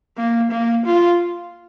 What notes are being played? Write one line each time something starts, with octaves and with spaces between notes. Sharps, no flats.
A#3
A#3
F4